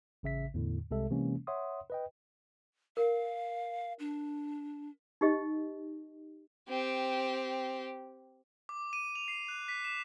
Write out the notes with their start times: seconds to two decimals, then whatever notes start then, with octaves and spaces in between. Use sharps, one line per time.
0.23 A1 C#3 E5 B6
0.54 E2 A2 D3
0.91 C2 C3 G#3 A4 E5
1.10 C3 E3 G#3 A#3 C#4
1.47 C#5 E5 F#5 C6 D#6
1.90 B4 D#5 G5
2.97 A#4 F5
3.99 D4
5.21 D#4 G4 D#5
6.69 C4 G4
8.69 D6
8.93 D#7
9.15 F7
9.28 C7
9.48 F#6
9.68 B6
9.85 E7